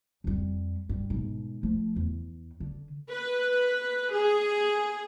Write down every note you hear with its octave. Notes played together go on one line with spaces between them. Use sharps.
F2 G3
G2
G#2 B2
F3 A3
E2
D3
B4
G#4